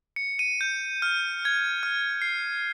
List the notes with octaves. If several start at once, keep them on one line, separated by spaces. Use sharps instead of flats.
C#7
D#7
G6
F6
G#6
F6
C7